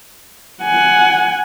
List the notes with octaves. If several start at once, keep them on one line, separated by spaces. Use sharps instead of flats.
F#5 G#5